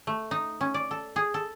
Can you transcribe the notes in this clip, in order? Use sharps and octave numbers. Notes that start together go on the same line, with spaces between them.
A3
D#4
C#4
D5
A4
G#4
A4